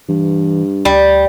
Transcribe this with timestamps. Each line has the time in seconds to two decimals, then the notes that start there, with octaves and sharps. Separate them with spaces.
0.09 G2 E3
0.85 D2 G3